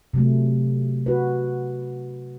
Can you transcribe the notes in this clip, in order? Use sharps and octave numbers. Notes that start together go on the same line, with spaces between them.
C3 F#3 A3
F#4 B4